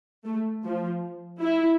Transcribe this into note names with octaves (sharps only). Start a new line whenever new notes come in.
A3
F3
E4